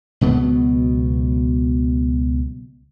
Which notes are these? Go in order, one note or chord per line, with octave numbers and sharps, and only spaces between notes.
C#2 B2 F#3 B3